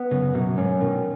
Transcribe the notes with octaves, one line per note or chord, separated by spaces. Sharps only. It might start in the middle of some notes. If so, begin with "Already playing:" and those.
Already playing: B3
F#2 C#3
F#2 B2
G#2 C#4
B2 D#3